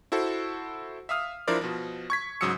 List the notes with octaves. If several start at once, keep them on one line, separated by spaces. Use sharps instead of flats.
E4 F#4 A4 C5
E5 F5 D#6 F6
F3 D4 E4 A#4 C5 D5
B2 F3
C#6 G#6 B6
G#2 C#3 F#3 D#6 E6 C#7